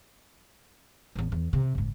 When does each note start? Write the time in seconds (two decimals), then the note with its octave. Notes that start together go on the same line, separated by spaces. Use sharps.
1.15 A1 E2
1.32 E2
1.53 C3
1.75 F#1 G#2